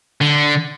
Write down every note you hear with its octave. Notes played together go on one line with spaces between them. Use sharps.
D3